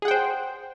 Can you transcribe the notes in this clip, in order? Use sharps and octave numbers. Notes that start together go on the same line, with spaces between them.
G#4 C5 F#5 G5